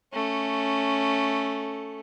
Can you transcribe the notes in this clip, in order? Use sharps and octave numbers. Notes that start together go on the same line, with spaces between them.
A3 C#4